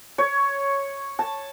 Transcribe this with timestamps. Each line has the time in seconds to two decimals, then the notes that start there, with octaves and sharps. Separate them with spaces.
0.18 C#5
1.19 A5